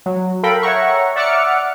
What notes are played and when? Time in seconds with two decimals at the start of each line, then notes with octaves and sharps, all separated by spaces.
0.06 F#3
0.43 A4 A#4 F5 G5 B5
0.63 C#5 E5 F#5 A#5 C#6
1.16 D5 E5 F#5 D6 F6 C#7